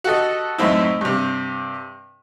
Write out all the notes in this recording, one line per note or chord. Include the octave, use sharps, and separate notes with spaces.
F#4 G4 A4 D#5
F#2 A2 C4 D#4 E4
G2 C3